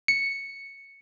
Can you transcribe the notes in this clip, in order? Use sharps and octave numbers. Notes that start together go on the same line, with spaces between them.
C#7